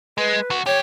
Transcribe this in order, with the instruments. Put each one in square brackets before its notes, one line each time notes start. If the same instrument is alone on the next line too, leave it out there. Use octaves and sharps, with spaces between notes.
[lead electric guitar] G#3 [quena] B4
[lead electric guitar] D2 F#4
[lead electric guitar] E2 G4 [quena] C#5